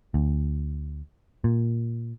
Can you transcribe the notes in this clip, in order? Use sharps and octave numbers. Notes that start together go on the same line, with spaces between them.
D2
A#2